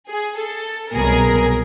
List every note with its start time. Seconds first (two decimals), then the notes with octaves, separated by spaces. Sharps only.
0.09 G#4
0.38 A4
0.94 C2 B2 F#3 G#4 A#4